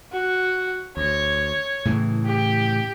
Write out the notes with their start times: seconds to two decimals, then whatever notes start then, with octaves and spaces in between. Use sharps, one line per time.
0.12 F#4
0.97 D2 C#5
1.85 A2 C#3 E3
2.25 G4